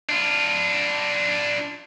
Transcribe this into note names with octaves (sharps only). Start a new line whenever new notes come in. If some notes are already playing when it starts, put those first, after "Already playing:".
D4 F4